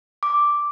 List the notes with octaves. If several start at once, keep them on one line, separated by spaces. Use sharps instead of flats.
D6